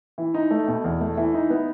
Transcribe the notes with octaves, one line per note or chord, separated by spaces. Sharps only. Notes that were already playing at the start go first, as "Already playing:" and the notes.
E3
D#4
A3
B2
E2
A3
E3
D#4
B3